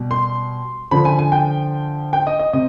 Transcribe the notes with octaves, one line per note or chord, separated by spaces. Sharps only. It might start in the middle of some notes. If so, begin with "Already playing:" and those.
Already playing: B2 G3
C6
D3 F3 B5
G#5
G#5
G5
G5
D#5
D#5
C3 D#5